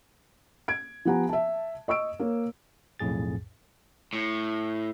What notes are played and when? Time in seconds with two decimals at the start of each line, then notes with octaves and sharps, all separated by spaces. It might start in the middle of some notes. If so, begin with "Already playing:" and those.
0.68 G#6 D7
1.05 F3 B3 G4 F#5 G#5 A#5
1.29 E5 A5
1.88 D#5 C#6 E6 D7
2.20 A#3 C#5
2.99 B1 F2 A2 G#4 A6
4.13 A2